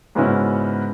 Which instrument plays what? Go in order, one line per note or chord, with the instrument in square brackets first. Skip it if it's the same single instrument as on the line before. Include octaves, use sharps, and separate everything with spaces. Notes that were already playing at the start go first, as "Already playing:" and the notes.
[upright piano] G#2 C#3 B3 C#4 E4 F#4